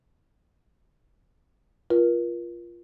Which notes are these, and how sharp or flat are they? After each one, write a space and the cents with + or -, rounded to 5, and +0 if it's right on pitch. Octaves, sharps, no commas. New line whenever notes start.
F4 -10 A#4 +40